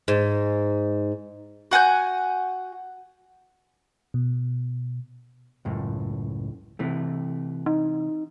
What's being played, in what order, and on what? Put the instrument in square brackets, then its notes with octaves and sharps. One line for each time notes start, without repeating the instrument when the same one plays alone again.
[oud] G#2
[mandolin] F#4 F#5 G#5 G6
[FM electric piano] B2
[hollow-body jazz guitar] C#2 F#2 A2
C3 E3 A3
[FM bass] D#4